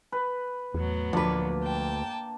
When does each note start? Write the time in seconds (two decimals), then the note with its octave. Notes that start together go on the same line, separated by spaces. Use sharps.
0.12 B4
0.74 E2 A2 F#3 B3
1.13 D2 F3 A#3 D4 B4
1.62 G5 A5